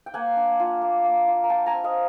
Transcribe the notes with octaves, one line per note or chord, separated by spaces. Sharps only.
G5
A#3 F#5 G#5
D4
F4
A#3
A#3
F4
A#5
F4 G5 A5
G#5 A#5
C4
D#5 F5